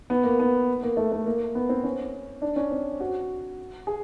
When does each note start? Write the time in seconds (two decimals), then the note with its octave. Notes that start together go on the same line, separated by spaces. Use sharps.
0.10 B3
0.24 A#3
0.39 B3
0.83 A#3
0.97 A3
1.12 A3
1.26 A#3
1.55 B3
1.69 C4
1.84 C#4
2.42 D4
2.56 C#4
2.71 C4
3.00 F#4
3.87 G#4